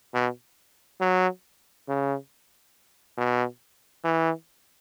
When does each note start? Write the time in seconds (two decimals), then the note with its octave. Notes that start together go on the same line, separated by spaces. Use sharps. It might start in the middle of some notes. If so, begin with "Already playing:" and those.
0.14 B2
1.01 F#3
1.89 C#3
3.18 B2
4.04 E3